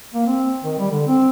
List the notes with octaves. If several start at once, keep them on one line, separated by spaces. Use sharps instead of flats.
A#3
C4
D#3
G3
D3
C4